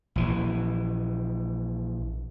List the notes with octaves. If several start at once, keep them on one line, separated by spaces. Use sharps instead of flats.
A#1 E3